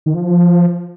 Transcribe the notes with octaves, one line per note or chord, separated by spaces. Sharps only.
D#3
F3